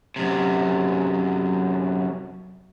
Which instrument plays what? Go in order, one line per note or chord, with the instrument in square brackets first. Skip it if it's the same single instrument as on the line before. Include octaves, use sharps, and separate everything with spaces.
[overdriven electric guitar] F#2 C3